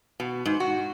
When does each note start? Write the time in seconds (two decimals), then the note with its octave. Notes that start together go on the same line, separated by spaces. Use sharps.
0.20 B2
0.45 G#2
0.60 F#4